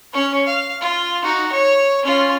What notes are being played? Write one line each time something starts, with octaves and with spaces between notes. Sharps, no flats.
C#4 C#5
F5
F4
D#4 F#4
C#5
C#4 F4